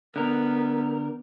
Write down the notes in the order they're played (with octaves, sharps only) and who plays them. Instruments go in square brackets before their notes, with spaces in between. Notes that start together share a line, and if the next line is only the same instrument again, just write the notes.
[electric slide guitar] D3 A#4 [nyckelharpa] B3